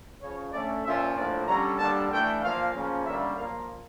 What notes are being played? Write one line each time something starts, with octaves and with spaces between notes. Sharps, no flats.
C#3 F3 C#4 C#5
D3 A3 C#4 D5
A#2 F3 C#4 E5
A2 F3 A#3 D4 D5
D3 G3 C#4 A#5
D3 G3 A#3 D4 A5
E3 A3 D4 G5
A#2 F3 A#3 F5
C#3 F3 A#3 C#4
D3 G3 A#3 C#4 E5
A#2 F3 A#3 F5